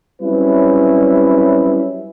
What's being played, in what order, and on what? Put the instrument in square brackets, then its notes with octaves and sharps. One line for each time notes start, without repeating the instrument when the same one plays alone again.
[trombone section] F#3 G3 C4 C#4 E4 B4